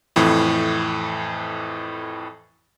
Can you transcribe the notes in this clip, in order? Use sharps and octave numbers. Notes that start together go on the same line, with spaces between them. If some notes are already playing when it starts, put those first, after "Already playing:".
F2 A2 E3